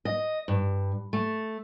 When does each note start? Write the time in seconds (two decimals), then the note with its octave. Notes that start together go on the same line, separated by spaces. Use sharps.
0.05 D#5
0.48 G2
1.13 A3